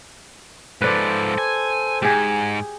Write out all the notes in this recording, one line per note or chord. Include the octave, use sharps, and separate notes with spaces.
G#2 F3 A4 B4 C5 D5
G#5
G#2 G4 G#4